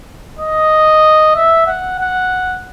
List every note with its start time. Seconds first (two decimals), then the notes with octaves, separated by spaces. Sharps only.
0.39 D#5
1.36 E5
1.67 F#5
1.99 F#5